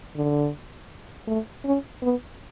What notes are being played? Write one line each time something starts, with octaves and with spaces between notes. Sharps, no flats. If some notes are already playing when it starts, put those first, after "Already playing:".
D3
A3
C#4
B3